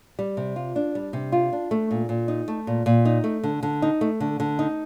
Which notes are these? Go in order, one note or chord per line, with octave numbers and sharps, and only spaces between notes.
G3
C3
F4
D4
G3
C3
F4
D4
A3
A#2
A#2
D#4
A3
A#2
A#2
D#4
A3
D3
D3
D#4
A3
D3
D3
D#4